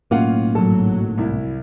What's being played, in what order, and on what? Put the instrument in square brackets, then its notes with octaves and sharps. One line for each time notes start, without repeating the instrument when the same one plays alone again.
[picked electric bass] B1 A2 A#3 [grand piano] C#4 F4 F#5
[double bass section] G#1 F#3 [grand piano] A4
[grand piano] C2 E4